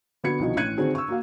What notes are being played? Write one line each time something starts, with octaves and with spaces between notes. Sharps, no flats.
D3 B3 F#4 G#6 C#7
C2 B2 D#3 F3 F#4 D#5
A1 C#4 F#6 G#6 C#7 D#7
D3 D#3 C4 D4 F#4 G#4
C#6 E6
A#3 F#4 F5